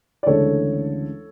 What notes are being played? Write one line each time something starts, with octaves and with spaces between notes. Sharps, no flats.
D5
D2 C#3 E3 G#3 D4 A4 C#5